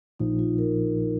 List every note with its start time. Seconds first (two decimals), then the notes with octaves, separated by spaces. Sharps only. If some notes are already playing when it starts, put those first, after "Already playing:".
0.19 A#1 A#2 F3 D#4
0.39 F4
0.58 A#4